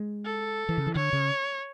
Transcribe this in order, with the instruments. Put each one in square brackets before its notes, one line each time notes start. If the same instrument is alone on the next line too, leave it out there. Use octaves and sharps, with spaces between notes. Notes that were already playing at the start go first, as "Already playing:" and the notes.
Already playing: [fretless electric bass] G#3
[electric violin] A4
[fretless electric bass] E3
C#3
E3
[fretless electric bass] D3 [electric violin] C#5
[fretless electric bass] C#3